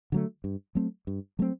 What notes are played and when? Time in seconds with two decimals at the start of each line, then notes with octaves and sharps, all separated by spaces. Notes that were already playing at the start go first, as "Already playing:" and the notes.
0.12 D3 F#3 A3
0.44 G2
0.75 F#3 A3 C4
1.07 G2
1.39 F#3 A3 C4